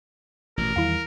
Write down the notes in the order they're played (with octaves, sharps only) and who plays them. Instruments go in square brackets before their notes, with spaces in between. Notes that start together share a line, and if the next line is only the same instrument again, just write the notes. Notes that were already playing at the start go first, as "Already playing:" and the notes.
[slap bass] A1 B2 [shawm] A#4
[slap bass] E2 D#3 G3 [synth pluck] E4 F5